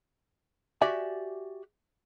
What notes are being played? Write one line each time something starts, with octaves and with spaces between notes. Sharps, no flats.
F#4 G4 D5 E5 G#5